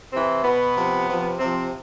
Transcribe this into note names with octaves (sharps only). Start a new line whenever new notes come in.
C3 E3 C4
B2 B3
C3 F3
C3 F3
C3 F3 C4